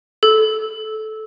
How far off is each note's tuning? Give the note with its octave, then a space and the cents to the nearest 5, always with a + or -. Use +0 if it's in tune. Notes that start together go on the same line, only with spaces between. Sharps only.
A4 -15